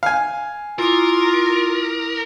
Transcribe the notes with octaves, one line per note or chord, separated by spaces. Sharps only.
F5 G#5
E4 F4 A#4 D6 D#6